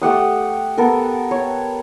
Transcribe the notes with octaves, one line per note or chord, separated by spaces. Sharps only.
A3 G4 F#5 D#6
B3 A4 A#4
C#5